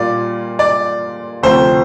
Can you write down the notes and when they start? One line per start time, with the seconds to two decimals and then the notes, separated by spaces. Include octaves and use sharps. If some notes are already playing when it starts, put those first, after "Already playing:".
Already playing: A#2 G3 A#3 F4 D5
0.59 D5
1.43 D2 C3 F3 C4 C5